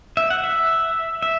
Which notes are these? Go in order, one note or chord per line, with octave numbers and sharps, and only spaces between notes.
E5
F#5
E5
E5